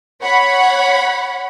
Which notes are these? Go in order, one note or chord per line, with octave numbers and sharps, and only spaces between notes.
C#5 F#5 B5